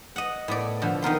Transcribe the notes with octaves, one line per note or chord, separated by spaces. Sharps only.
D#5 F#5
A2 B3 D5
B2 D3 F3
D#3 B3 A#4 C6